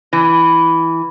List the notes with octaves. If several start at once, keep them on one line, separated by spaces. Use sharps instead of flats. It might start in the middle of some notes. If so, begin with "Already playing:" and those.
E3